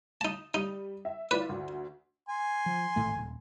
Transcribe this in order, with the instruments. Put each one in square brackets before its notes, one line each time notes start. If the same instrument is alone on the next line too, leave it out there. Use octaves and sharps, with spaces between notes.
[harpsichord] D#4 A5
[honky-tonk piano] G3 [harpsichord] D#4
[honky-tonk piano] E5
[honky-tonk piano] E4 F4 D5 [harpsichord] B4
[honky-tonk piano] D2
[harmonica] G#5 C6
[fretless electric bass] F3
G#1 A2 A3
D#1